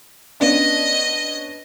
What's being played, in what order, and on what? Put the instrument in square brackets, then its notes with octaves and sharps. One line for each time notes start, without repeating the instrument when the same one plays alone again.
[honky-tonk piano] B3 C#4 D4 [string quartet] D#5